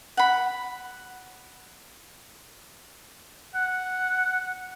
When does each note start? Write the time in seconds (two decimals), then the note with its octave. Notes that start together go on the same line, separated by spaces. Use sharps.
0.17 F#5 B5
3.55 F#5